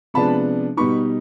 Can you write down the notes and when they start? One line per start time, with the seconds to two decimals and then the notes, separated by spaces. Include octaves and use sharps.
0.14 C3 F3 G#3 B3 D4 A5 B5
0.77 B2 G3 B3 D#4 B5 C#6